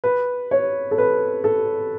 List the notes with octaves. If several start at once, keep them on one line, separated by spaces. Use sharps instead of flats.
B4
C#5
A4
B4
A4